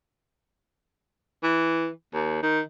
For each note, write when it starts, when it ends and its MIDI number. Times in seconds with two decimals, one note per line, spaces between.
1.43 1.88 52
2.14 2.42 39
2.43 2.60 51